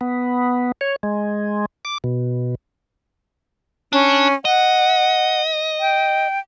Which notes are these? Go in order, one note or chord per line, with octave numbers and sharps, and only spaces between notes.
B3
C#5
G#3
D6
B2
C#4 D4
D#5 F#5
G5